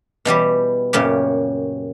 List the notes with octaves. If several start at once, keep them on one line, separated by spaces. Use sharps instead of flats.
B2 E3 G3 G4
F#2 A#2 C#3 G4